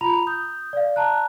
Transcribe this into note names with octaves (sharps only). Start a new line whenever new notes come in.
F4 A#5 B5 F7
D#6 G6
D5 F5
A5 A#5 F#6